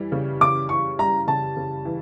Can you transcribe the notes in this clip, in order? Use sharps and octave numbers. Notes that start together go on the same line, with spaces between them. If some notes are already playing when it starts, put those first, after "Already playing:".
Already playing: E3 G3
C#3
C#3 D6
E3 C#6
G3 A#5
C#3 A5
C#3
E3